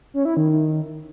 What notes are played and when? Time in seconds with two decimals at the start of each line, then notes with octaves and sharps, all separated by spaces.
0.14 C#4
0.25 E4
0.37 D#3